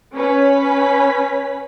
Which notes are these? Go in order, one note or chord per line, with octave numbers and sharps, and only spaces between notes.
C#4 B4 B5 B6